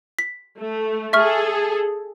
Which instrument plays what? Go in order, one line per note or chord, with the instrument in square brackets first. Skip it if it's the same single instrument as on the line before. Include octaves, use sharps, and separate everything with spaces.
[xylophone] B6
[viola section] A3
[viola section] G#4 A4 [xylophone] E5 C#6 F6